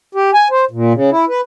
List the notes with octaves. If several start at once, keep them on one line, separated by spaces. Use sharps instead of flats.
G4
G#5
C5
A#2
C#3
E4
B4